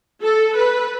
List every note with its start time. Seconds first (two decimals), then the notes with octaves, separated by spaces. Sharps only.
0.22 A4
0.55 B4